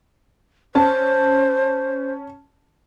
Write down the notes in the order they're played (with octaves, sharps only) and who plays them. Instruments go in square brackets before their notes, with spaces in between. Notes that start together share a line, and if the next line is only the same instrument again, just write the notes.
[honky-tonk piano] C#4 A5 [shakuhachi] C5